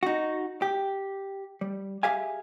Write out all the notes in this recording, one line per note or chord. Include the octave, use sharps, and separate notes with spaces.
D#4 F#4
G4
G3
G4 G#4 E5 F5 G#5